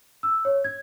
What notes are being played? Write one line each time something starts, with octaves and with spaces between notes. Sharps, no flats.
E6
C#5
G#6